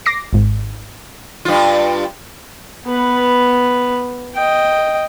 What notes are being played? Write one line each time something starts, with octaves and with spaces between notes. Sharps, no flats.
D6 A#6 C7
G#1 G#2
G2 F4
B3 B4
D#5 G5